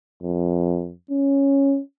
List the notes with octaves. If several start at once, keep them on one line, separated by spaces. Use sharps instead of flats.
F2
C#4